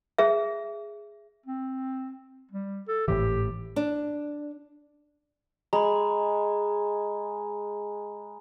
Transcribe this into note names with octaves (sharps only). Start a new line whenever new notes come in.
G#4 E5
C4
G3
A4
G#1 A2 E3 G4
D4
G#3 A#5 B5